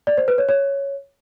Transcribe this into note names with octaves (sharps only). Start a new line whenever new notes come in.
D5
C5
B4
C#5
C#5